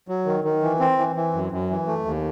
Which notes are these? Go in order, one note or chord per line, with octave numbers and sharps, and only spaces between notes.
F#3
D#3
D#3
E3
C4
E3
E3
F#2
F#2
E3
A3
D#2